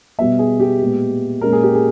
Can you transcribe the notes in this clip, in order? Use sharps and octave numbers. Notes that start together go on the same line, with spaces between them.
B2 G3 B3 E5
G#4
G4
A#2 G#3 B3
A#2 G#3 C#4 A#4
G#4
G4
G#4